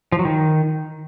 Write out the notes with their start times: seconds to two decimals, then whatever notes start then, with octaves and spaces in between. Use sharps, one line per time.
0.12 F3
0.19 F#3
0.25 D#3